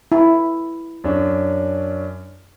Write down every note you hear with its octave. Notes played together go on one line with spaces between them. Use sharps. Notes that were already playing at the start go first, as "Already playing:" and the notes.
E4
F#2 C#4 D4